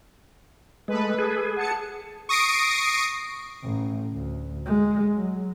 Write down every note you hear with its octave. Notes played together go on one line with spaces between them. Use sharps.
G#3 A3 A4 B4
G#4
F#5 A5 C#7
C#6 D#6 A#6 C7 D7
A1
D2
G#3
F#3